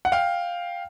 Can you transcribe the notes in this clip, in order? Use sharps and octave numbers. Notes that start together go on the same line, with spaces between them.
F#5
F5 G5